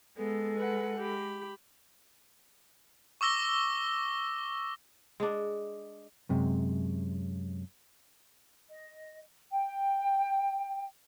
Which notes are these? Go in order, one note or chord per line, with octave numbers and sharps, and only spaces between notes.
G#3 B3 A4
B4 F#5
G4 B5
C#6 D6 E6 A#6 G7
G#3 D4
F#2 C3 G#3
D#5
G5